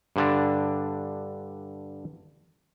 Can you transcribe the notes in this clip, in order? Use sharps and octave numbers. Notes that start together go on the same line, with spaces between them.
G2 D3 D4